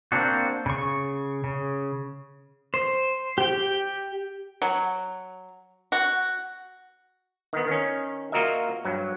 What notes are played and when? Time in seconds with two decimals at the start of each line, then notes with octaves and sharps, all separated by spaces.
0.12 A#3 C4 D4 F#4
0.66 C#3 C#6
1.44 C#3
2.74 C5
3.38 G4 G5
4.62 F#3
5.92 F#4
7.53 D#3 B3
7.67 D#3 C#4
8.32 A#3 F4 F#4 A#4 D#5 E5
8.84 G2 F#3